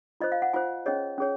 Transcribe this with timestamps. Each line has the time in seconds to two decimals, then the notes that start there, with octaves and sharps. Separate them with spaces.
0.20 F4 C5 D#5
0.32 F5
0.42 F#5
0.53 F4 C5 G#5
0.86 C#4 G#4 C#5 D#5
1.18 C#4 G#4 C#5